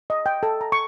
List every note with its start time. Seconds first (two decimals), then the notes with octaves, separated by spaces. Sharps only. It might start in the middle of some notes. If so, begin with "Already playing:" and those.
0.10 D#5
0.26 G5
0.43 A4
0.61 A#5
0.72 C#6